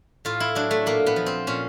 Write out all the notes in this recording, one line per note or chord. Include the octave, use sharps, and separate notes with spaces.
A2 F4
E4
F#3 D4
A3
A#2 A#3
B3
F3
C4
A#2 C#4